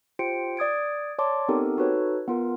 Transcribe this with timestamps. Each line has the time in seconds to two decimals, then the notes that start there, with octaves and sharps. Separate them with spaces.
0.19 F4 G4 C5 G5 C#7 D7
0.57 D5 D#6 G#6 D7
1.19 C#5 D5 A5 C6 D6
1.48 B3 C4 D#4 G4 A4 A#4
1.77 D#4 F#4 A4 B4 C#5
2.28 B3 F4 A#4